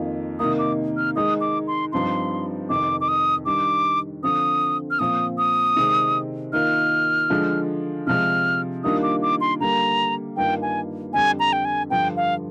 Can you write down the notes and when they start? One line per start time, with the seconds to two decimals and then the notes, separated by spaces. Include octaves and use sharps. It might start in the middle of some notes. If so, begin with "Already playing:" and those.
Already playing: F2 D#3 A#3 F4
0.39 C3 D#3 A#3 D#4 D#6
0.59 D6
0.97 F6
1.16 D#3 G#3 D#4 D#6
1.41 D6
1.68 C6
1.92 G2 F3 C4 D#4 C6
2.69 F2 C3 D#3 D6
3.01 D6
3.08 D#6
3.46 D#3 G3 D4 D6
4.23 D3 F3 C4 D#6
4.91 F6
4.99 A#2 F3 C4 F4 D#6
5.38 D#6
5.77 C3 D#3 G#3 C4
6.53 D#3 A#3 F4 F6
7.30 D3 F3 G#3 D4 F4
8.07 C3 F3 G#3 F6
8.84 D#3 G3 A#3 D4 F4 D#6
9.03 D6
9.22 D6
9.41 C6
9.60 D3 G3 A#3 A#5
10.37 G2 D#3 A#3 F4 G5
10.62 G#5
11.13 F2 D3 G3 G#5
11.40 A#5
11.53 G5
11.65 G#5
11.90 G2 D3 F3 G5
12.16 F5